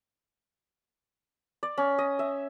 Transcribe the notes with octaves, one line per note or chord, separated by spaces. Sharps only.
D5
C#4
D#5
E5